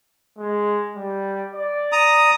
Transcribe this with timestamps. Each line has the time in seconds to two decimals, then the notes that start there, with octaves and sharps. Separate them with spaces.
0.38 G#3
0.96 G3
1.55 D5
1.92 A#5 D#6